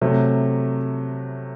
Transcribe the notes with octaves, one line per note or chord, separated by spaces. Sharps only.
C3 F#3 A3